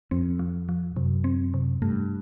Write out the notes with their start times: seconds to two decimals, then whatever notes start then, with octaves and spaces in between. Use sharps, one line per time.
0.11 F2 C4
0.39 F3
0.69 F3
0.96 F#2 C3
1.24 C4
1.54 C3
1.82 G2 A3